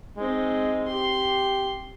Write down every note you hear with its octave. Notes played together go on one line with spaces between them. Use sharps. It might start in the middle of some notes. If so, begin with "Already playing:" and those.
G#3 C4 D#4
G4 C6